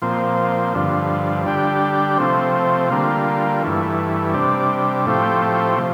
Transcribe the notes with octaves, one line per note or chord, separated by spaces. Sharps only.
A#2 F3 C4
G2 D3 F3
D3 G3 D4 G4
C3 F3 A3 C4
D3 G3 A#3 F4
G2 E3 A3
C3 G3 D4
A2 F3 A3 C4 G4
C3 F3